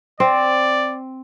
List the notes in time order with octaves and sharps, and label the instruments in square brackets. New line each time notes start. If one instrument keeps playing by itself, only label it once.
[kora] C4 [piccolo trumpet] D5